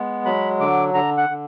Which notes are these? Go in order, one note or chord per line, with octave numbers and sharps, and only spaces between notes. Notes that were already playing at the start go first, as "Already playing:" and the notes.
Already playing: G#3 B3
F#3 B5
D3 D6
D3 A#5
F#5
D3